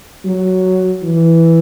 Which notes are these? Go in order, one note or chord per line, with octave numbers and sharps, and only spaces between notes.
F#3
E3